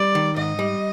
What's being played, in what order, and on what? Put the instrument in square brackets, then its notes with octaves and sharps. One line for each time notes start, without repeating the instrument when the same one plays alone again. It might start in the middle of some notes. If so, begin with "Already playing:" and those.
Already playing: [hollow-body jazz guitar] G3 [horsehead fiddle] D5
[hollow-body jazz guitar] D#3
[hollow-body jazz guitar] G#2 [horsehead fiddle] D#5
[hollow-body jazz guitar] G3